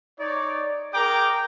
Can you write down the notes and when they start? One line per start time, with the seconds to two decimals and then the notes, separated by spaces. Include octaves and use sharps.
0.19 D#4 C#5 D5
0.93 G#4 A#4 G5 A#5 D6